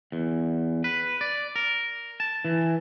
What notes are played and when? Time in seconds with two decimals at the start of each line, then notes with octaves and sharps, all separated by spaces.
0.12 E2
0.84 B4
1.21 D5
1.56 A#4
2.20 A5
2.45 E3